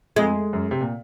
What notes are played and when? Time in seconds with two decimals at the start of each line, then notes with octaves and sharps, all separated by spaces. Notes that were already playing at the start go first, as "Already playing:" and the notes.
0.16 F2 G#3
0.53 F#2
0.71 C3
0.81 A#2